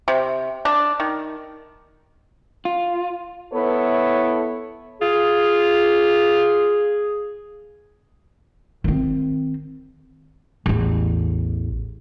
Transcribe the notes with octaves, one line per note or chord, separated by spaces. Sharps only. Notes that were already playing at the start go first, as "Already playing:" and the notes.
C3
D4
D#3
F4
B3 E4 A4 B4 C#5
F4 G#4
D#3 C4
A1 E2